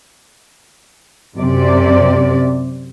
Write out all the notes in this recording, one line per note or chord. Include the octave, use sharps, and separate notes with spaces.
F#2 C3 D5